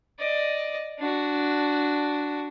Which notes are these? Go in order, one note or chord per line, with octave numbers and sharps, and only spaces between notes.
D5 D#5
D4 F#4